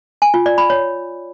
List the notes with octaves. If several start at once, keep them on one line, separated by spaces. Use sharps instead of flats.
G#5
F4
D5
B5
C#5